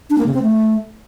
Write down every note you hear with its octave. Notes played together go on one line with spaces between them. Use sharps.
D4
A#3
C#3
C4
A3